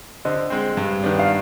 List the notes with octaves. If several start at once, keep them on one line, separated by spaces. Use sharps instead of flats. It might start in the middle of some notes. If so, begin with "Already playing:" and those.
D3 C5 D#5
G#3 C4
G2
D#3 B3 D4
F5